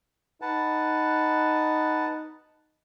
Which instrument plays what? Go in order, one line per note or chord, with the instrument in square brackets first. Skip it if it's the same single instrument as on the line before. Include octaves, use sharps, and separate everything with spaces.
[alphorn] D#4 [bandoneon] B4 F#5 A5